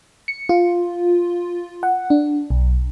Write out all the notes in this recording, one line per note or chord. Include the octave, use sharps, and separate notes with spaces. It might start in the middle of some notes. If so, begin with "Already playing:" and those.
C#7
F4
F#5
D4
B1